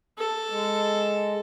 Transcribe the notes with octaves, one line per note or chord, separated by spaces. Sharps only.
A4
G#3